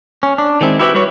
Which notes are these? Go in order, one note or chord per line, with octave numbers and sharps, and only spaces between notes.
C#4
D4
D#3 G#3 C4 E4
E4 F#4 G4 B4 C5 E5
G3 F#4 B4 C#5